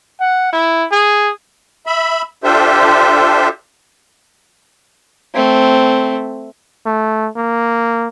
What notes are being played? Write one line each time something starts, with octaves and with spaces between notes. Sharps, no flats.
F#5
E4
G#4
E5 B5
D4 F4 G4 A4 C5 E5
A3 C4
A3
A#3